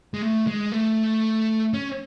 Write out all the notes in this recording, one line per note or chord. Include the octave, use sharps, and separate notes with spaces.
G#3
A3
G#3
A3
C#4